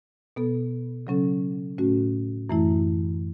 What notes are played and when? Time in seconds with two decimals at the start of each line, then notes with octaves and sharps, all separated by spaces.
0.36 B2 B3 A4
1.07 C#3 F#3 C#4 A4
1.78 A2 A3 C#4 F#4
2.49 F#2 E3 A3 E4